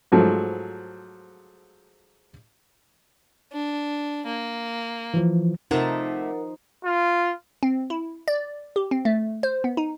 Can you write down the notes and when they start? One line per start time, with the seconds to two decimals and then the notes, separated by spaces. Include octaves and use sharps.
0.12 G#2 F3 F#3 A3
3.53 D4
4.26 A#3
5.14 E3 F3
5.71 C3 F3 A3 D#4 A#4 F#5
6.85 F4
7.63 C4
7.90 E4
8.28 D5
8.76 G4
8.91 C4
9.05 A3
9.43 C5
9.64 B3
9.77 D#4